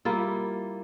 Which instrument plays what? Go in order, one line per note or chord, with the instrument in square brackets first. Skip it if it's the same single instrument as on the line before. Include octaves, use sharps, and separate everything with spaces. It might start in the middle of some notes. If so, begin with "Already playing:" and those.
[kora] G3 A#3 E4 F4